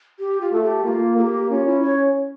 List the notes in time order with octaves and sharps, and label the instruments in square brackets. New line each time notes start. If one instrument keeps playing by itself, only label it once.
[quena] G4
F4
[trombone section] A3 [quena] A4
[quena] G4
[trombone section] A#3 [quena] F4
[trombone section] A#3 [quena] A4
[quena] G4
[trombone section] C#4 [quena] F4
[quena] E4
C#5